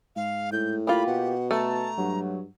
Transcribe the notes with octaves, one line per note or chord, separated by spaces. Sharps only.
G#2 F5
A2 G6
A#3 F4 G4 B5
B2 F#5
A3 A5 A#5
G2 F#3